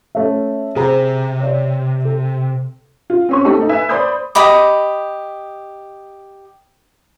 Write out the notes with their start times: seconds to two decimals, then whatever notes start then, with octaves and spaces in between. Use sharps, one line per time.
0.15 A3 C#4 E5
0.76 C3 G#4 C5 A#5
1.40 C#5 D5
2.05 A4
3.10 F4
3.29 C4 C#4 C#6
3.45 A3 C4 D#4 G4 A4
3.57 A3 D#4
3.69 B4 E5 G#5
3.89 C5 D5 B5 C6 D#6 G6
4.35 G4 D#5 B5 D6